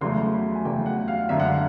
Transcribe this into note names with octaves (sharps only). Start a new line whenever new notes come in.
E2 C#3 F#3 A3 C6
B5
G#5
E2 C#3 F#3 A3 G5
F#5
F5
G#1 F#2 D3 F#3 E5
F#5
F5